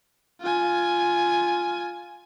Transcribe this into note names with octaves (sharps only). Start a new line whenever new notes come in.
F4 G#5